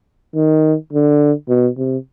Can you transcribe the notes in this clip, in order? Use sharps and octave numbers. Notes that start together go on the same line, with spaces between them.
D#3
D3
B2
C3